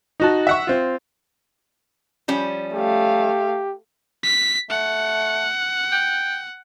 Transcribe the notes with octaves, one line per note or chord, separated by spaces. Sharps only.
D#4 F#4 A5
E5 F#5 C#6
C4 F4
F3 G3 C#4
A3 G4 F5
B6
A3 F#5
G5